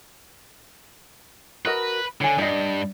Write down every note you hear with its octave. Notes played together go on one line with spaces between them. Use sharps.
F#4 A#4 B4 D#5
D3 C#5 G#5
G2 D5 D#5